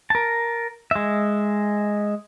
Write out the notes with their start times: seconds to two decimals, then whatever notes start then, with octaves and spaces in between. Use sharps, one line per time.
0.10 A#4 A5
0.91 G#3 E5